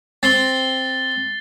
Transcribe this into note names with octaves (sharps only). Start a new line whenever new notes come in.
C4 A6 C7 G7